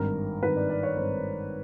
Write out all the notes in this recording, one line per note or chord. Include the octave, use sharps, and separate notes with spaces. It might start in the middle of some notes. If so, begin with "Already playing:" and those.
Already playing: G#1 G2 D#3 A#4
G#1 G2 D#3 B4
D5
D5
C#5
G#1 G2 D#3 C5